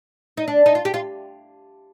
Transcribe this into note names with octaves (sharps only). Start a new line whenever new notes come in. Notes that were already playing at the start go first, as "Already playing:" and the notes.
D#4
D4
D#4
F4
G4
F4